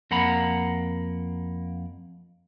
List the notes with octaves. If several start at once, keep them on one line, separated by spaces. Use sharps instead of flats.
F2 A#3 F#5 A#5 B5